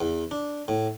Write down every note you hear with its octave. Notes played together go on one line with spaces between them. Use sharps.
E2
D4
A2